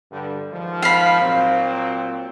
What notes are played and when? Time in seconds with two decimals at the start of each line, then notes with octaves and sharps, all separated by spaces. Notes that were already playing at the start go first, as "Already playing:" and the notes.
0.11 G2 D3 G3
0.52 G#2 D#3 F3
0.82 F5 B5
1.21 A#2 F#3 C4